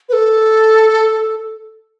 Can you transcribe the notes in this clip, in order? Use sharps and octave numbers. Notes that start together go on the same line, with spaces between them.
B4
A4